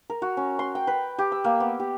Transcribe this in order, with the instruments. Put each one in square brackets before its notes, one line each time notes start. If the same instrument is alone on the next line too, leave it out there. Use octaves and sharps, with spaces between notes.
[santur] A#4
F#4
C#4
C6
G5
B4
G4
E6
A#3
B3
G4